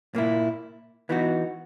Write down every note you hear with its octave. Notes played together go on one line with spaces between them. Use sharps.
A#2 A#3 E4
E3 B3 D#4 F#4